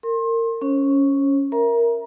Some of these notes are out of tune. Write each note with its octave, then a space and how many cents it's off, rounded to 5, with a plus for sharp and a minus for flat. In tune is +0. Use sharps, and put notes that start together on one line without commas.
A#4 -30 C6 +30
C#4 +5 C5 +45
A#4 +5 E5 +0 A#5 +30